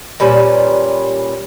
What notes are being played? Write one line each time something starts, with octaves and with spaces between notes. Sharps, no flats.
A#2 G3 C#4 B4